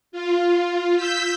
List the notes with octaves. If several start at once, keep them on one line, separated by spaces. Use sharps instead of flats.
F4
E6 G6 B6